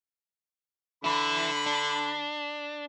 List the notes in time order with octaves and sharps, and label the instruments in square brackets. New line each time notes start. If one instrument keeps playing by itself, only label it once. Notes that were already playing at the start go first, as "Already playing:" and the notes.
[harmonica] D3 B5 [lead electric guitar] E4 B4
[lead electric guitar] D4